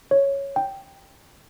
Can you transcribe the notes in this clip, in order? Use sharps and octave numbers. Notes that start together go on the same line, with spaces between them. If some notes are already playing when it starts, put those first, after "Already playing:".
C#5
G5